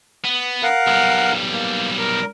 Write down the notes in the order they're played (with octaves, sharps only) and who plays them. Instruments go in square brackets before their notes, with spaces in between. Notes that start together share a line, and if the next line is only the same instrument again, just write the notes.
[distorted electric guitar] B3
[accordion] A#4 F5 F#5
[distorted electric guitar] B1 G3
[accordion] A#3
A#4